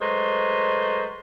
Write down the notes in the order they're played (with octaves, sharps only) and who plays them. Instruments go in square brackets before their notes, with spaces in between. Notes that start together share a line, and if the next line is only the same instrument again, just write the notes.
[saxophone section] F#3 G#3 A3 B4 C5